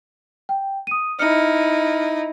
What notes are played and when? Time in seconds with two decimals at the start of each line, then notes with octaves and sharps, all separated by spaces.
0.49 G5
0.87 D#6 D#7
1.19 D#4 E4 F6 C#7